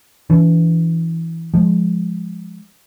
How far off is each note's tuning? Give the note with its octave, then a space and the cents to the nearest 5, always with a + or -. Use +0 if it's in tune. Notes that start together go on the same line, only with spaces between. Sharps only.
E3 +0 D4 -45
F3 +0 G#3 +0